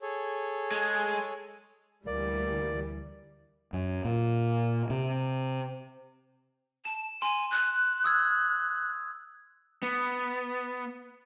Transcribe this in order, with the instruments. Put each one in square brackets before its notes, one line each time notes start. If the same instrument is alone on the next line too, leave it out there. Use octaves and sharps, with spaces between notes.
[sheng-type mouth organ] G#4 A4 C#5
[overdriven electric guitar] G#3
[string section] D2 E3 G3 [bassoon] A#3 [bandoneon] D5
[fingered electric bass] F#2
A#2
C3
[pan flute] A5 [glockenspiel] E7
[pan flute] G#5 [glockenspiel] C6
[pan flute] F#6
[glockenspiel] D#6 E6 G#6
[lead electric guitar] B3